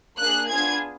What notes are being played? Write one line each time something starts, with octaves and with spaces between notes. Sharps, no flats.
A#3 D4 G#4 F#6
B3 D4 F4 G#4 G#6